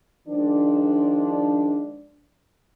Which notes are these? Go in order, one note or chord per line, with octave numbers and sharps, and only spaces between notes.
D#3 F3 G#3 D4